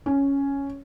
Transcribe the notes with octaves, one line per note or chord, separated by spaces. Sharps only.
C#4